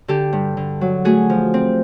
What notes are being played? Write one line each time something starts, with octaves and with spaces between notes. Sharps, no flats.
D3 G4 A4
G2
D3
F#3
A3 F#4 G#4
F3
C4